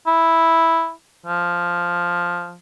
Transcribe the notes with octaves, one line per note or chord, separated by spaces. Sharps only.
E4
F3